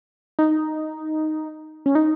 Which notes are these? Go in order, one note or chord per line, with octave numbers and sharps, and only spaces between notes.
D#4
C#4
D#4